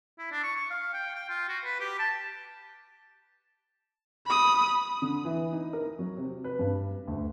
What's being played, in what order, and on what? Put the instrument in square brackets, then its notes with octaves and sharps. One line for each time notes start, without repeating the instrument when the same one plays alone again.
[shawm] E4
D4
C#6
C#6
F5
G5
G5
F4
F#4
B4
G4
A5
[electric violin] B5 D#6
[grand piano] D3
E3
D#4
A#4
F#3
C3
B4
G2
D2